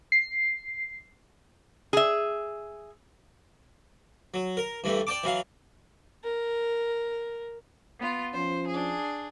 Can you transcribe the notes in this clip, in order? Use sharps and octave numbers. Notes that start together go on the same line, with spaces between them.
C7
G#4 E5
F#3
A#4
G2 E3 G3 A3
D5 G5 A5 D6
E3 F#3 F5
A#4
B3 F4
F3 C#4 C5
D4 G#4